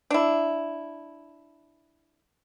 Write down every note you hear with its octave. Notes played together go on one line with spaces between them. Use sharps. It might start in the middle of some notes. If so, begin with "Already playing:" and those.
D4 E4